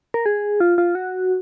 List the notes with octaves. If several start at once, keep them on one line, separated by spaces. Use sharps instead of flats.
A#4
G#4
F4
F4
F#4